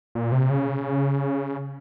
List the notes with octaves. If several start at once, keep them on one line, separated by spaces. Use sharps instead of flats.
A#2
C3
C#3